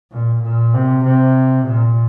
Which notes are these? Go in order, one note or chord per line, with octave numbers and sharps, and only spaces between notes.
A#2
A#2
C3
C3
A#2